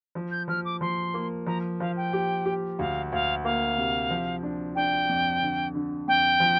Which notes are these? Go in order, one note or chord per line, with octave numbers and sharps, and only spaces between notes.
F3
G6
F3 F6
D6
F3 C6
A#3
F3 A#5
F3 F5
G5
G4
G4
D2 F5
D2 F5
A#3 F5
C3
F3
D4
D4 G5
F2
D3
D3
F2 G5
F3